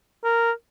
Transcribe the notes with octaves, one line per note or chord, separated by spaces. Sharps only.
A#4